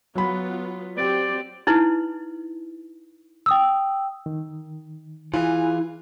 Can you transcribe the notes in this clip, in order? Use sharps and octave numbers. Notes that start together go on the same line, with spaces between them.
F#3 B3 F4 B5
F#3 C4 G4 D5
D#4 E4 B4
G5 D#6 E6
D#3
E3 F4 G#4